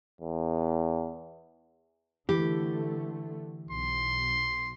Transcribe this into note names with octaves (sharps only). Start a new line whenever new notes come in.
E2
D3 E3 A3 G4
B1 C6